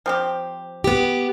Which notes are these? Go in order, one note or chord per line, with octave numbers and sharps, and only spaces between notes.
F3 C4 G4
B3 G4